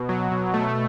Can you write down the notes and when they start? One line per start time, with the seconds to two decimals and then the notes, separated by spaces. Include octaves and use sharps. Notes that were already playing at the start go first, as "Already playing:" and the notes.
Already playing: B2
0.09 F#3
0.32 B2
0.54 A3